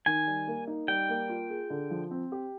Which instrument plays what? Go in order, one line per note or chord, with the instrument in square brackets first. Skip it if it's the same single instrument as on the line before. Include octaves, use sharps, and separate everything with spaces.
[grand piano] D#3 [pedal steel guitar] G#5
[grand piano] G3
A#3
D#4
[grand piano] G3 [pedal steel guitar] G5
[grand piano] A#3
F4
G#4
D3
F3
C4
G4